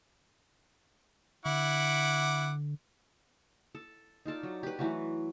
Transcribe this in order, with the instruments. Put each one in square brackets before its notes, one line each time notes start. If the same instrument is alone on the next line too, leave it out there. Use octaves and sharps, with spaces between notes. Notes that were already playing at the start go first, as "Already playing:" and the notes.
[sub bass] D3 [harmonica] E4 F#5 D6
[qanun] A4
D#4 F4 A4 D5
F#3
G4 B4
E3 F#3 A3 F#4